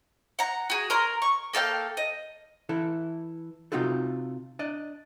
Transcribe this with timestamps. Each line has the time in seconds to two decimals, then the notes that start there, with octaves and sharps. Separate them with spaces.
0.39 F#5 A#5
0.70 F#4 G#4
0.90 A#4 A#5 C6
1.22 C#6
1.53 A#3 A4 F5 G5
1.97 D#5
2.69 E3 E4 A4
3.72 C3 C4 D#4 F4 F#4 A4
4.59 D4 D5 D#5